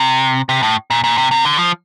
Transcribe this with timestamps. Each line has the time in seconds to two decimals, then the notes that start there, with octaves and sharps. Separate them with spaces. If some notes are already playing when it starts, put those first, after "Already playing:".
Already playing: C3
0.49 C3
0.63 A2
0.90 A#2
1.04 A#2
1.18 C3
1.31 C3
1.45 D3
1.59 F3